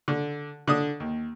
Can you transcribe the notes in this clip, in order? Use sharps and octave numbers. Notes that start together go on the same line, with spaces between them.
D3
D3 D4 D#6
D#2